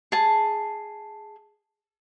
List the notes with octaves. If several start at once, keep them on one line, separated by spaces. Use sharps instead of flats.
G#4 A5